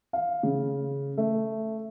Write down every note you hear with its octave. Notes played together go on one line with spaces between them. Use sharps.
F5
C#3
A3